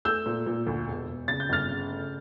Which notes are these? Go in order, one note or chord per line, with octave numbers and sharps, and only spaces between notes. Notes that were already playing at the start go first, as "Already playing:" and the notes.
A3 E6 G6
A#2
A#2
D2
E1
E1
C#3 A6
G6
G1 F6 A6
C#3
A3